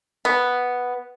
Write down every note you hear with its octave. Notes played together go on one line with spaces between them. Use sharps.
B3